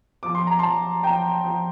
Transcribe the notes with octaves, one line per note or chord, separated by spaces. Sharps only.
F3 D6
C6
A#5
F3 A5 C6
F3 G5 A#5
F3